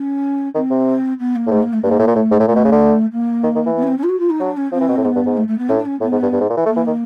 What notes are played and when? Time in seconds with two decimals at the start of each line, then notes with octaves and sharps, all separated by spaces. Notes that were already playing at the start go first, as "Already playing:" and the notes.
Already playing: C#4
0.55 D#3 C4
0.70 C3
1.19 B3
1.35 A#3
1.46 A2
1.51 G#2 A3
1.62 A#3
1.73 A3
1.83 G2 A#3
1.91 G#2
1.99 A2
2.07 A#2
2.15 A2 A3
2.31 G#2
2.40 A2
2.48 A#2 A3
2.56 B2
2.64 C#3
2.72 D3
3.12 A#3
3.44 D#3
3.55 D#3
3.66 E3
3.76 B3
3.83 C#4
3.87 C4
3.98 C#4
4.03 F4
4.09 F#4
4.19 F4
4.30 D#4
4.40 F#3 D4
4.57 C#4
4.72 F3 C4
4.80 E3
4.89 B2
4.97 A2
5.04 G#2 B3
5.15 G2
5.26 G#2
5.37 A3
5.47 A3
5.58 B3
5.69 A2 C#4
5.77 D4
5.85 C#4
6.01 A2 B3
6.12 G#2
6.22 G2
6.33 G2
6.41 G#2
6.50 A#2
6.57 E3
6.65 A3 A#3
6.76 E3
6.86 D#3